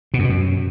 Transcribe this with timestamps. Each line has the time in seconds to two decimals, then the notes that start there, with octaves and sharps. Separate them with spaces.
0.14 B2
0.19 F#2
0.24 B2
0.30 F#2